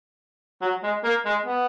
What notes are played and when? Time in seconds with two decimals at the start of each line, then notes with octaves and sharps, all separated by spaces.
0.61 F#3
0.83 G#3
1.04 A#3
1.25 G#3
1.46 B3